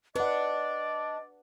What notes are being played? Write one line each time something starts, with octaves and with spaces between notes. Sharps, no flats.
D4 B4 D5 D#5 F#5